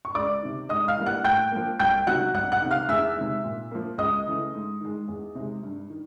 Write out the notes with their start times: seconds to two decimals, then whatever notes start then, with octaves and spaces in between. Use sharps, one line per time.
0.05 C#6
0.15 C#2 D5 D6
0.42 C3 D#3
0.69 G#2 D#5 D#6
0.88 F5 F6
0.97 E3 G3 A#3
1.06 F#5 F#6
1.24 A2 G5 G6
1.52 F3 A#3
1.79 C2 G5 G6
2.07 C3 D#3 F#3 F#5 F#6
2.34 C2 F#5 F#6
2.52 F#5 F#6
2.62 C3 D#3
2.71 F5 F6
2.88 E2 E5 E6
3.16 C3 D#3 G#3
3.44 A#2
3.71 F3 A#3
3.98 C#2 D#5 D#6
4.26 C#3 E3 A3
4.53 G#2
4.81 D#3 G#3
5.08 E2
5.35 C3 D#3 G#3
5.63 G2
5.90 D#3